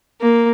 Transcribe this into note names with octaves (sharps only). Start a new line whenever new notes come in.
A#3